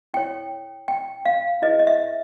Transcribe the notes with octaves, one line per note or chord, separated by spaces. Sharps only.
E4 A4 C#5 G5
G5
F5
E4 G#4 B4 D#5
D#5
E5